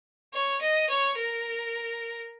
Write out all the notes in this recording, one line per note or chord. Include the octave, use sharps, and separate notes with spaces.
C#5
D#5
C#5
A#4